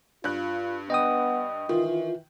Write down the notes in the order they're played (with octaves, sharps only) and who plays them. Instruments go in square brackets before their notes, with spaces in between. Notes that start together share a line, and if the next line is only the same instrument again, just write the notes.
[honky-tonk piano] G2 F#6 [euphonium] F4
[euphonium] B3 [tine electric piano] D#5 G5 D#6
[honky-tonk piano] D#3 [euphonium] E3 [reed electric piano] F4